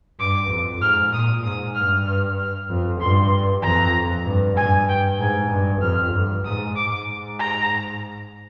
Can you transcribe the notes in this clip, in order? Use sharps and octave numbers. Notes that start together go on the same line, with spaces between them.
G2 D6
F2
G#2 F6
A#2 D#6
G#2 D#6
G2 F6
F6
F6
F2
G2 C6
F2 A#5
G2
G2 G#5
G5
G#2 G#5
G2
F2 F6
G2
G#2 D#6
D6
G#2
A#5